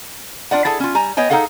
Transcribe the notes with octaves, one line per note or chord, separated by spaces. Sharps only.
D4 F4 D5 F#5
E4 G#4 A4 A5
C#4 F4
G3 G#5 A#5
B3 C#5 D#5 G5 G#5
D#4 F4 G#4 A4 F5 F#5